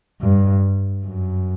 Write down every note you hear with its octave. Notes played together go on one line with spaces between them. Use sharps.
G2
F#2